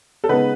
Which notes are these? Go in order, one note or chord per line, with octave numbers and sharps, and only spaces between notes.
A4
C#3 G#3 B3 D#4 B4